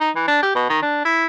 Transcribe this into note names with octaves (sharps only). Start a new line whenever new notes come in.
D#4
E3
D4
G4
B2
D#3
D4
E4